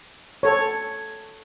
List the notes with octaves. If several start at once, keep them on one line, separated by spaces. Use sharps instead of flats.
A4 C#5